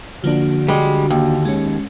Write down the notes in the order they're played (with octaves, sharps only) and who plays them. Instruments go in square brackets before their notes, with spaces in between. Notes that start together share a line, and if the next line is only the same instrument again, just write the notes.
[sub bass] D3 [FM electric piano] F3 A#3 D4 [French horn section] F#4
[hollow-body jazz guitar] G3 G#3
D#2
[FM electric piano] G#3 C#4